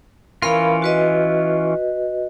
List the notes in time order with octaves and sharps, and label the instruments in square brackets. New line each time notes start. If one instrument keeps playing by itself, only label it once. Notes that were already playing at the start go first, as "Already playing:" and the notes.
[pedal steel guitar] E3 C#4 F4 [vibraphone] A#4 F5 B5
[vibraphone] F#4 B4 D#5